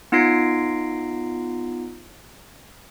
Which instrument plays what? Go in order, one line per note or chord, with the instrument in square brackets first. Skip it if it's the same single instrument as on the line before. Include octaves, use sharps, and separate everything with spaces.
[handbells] B3 D#4 F4 A#6 C7 D7